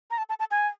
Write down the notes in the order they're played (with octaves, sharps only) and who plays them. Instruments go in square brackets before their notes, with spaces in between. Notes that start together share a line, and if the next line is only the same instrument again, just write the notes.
[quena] A#5
A5
A5
A5
G#5